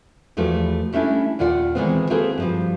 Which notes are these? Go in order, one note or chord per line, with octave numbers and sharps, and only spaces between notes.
E2 F3 A3 F#4 G4 B4
G3 A3 C#4 D4 E4 A4
D#2 A#2 F4 D5 F#5
D#3 E3 F#3 G#3 B3 C4
A#3 C4 F#4 G#4 A4 B4
G2 F3 G3